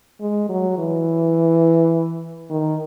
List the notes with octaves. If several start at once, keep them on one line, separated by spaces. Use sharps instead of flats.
G#3
F#3
E3
D#3